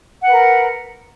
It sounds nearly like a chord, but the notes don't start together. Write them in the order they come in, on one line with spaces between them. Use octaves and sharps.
F#5 B4 A#4